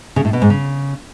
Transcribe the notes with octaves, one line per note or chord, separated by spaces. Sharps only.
C#3
A2
B2
G#2
C#3